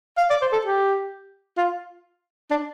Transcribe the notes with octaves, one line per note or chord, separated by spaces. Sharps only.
F5
D5
C5
A4
G4
F4
D4